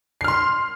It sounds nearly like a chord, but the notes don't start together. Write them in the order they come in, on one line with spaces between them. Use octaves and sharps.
C7 F6 C6